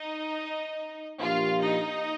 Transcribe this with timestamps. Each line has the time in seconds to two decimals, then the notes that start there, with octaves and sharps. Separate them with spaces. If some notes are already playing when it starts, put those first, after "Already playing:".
Already playing: D#4 D#5
1.21 A#2 F3 A#3 D4 F4 G4 F5
1.61 D#4 D#5